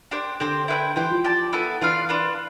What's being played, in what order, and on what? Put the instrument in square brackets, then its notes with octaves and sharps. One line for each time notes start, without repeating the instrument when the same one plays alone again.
[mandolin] D4 G4 C5
[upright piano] D3 [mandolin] C4 G4 C5
[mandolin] E4 B4 E5 G5
[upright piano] E3 [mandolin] G4 C5 G5
[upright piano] F3
[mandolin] G4 D5 A5
B3 E4 A4
[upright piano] E3 [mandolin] D4 F4 B4 F5
[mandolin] D4 F4 B4